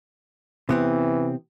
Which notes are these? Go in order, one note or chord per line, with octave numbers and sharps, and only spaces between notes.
C3 E3 B3 C4